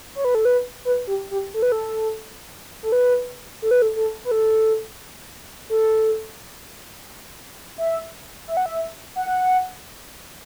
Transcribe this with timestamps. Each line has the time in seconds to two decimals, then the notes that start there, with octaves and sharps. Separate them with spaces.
0.15 C#5
0.25 B4
0.35 A4
0.45 B4
0.85 B4
1.07 G4
1.31 G4
1.54 A4
1.62 B4
1.72 A4
2.83 A4
2.92 B4
3.62 A4
3.71 B4
3.82 A4
3.96 A4
4.25 B4
4.31 A4
5.70 A4
7.78 E5
8.47 E5
8.57 F#5
8.66 E5
9.16 F#5